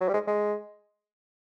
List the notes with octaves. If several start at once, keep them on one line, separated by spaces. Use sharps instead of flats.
F#3
G3
G#3
G#3